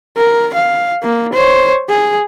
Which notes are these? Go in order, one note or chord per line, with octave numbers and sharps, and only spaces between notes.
A#4
F5
A#3
C5 C#5
G#4